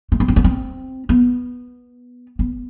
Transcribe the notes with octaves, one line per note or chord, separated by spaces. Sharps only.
A3
B3
C4
B3
C4
B3
B3